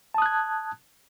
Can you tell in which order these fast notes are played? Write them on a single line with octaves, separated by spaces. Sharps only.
A5 D#6 F#6 G#6